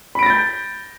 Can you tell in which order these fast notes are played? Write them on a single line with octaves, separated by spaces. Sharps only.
B5 D7 A#6 A6 G6